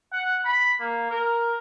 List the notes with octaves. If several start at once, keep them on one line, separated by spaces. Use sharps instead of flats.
F#5
B5
A#3
A#4